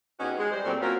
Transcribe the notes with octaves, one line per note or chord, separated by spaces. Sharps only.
E2 C#4 D#4 F#4 G4 B4
G#3
G3 C5
A#2 F#3 G3 A3 C4
A#3 C4 C#4 F4 F#4 A#4